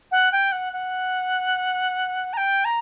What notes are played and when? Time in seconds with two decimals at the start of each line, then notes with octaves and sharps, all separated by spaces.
0.11 F#5
0.32 G5
0.52 F#5
0.73 F#5
2.33 A#5
2.37 G5
2.65 A#5